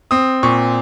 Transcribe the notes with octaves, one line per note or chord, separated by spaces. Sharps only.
C4 D#6
A#2 C#6